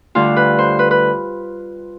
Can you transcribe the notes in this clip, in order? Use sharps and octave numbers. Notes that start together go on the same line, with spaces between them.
D2 D3 G3 F4
B4
C5
B4
B4